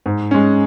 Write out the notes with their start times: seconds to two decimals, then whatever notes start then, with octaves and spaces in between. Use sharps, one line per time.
0.06 G#2
0.31 G#3 C#4